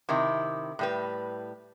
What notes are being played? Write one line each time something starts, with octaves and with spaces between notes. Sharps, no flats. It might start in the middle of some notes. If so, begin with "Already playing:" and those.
C3 D#3 E4
A2 G3 B4